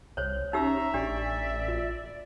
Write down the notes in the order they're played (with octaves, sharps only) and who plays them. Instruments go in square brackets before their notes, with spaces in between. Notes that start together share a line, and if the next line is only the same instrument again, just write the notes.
[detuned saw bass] C2 [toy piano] C5 C#5
[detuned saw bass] C#4 [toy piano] D#4 G4 E6 [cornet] E5 [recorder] A#5
[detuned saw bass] A1 [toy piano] D4 G4 [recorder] D5
[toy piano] F4